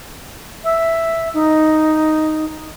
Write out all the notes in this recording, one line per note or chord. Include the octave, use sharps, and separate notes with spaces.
E5
D#4